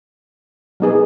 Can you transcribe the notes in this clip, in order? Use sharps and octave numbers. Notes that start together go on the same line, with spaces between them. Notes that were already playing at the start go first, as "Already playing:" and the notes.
F#3 B3 D#4 G#4 B4